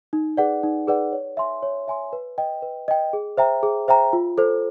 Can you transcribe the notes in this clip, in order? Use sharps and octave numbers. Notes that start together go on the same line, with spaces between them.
D#4
G#4 B4 D5 F#5
D#4
G#4 B4 D5 F#5
C#5
E5 G#5 C6
C#5
E5 G#5 C6
B4
D#5 G5
B4
D#5 G5
G#4
C5 E5 G5 A#5
G#4
C5 E5 G5 A#5
F4
A4 C5